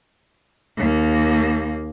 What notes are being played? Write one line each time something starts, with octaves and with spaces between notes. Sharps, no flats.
D#2 A#3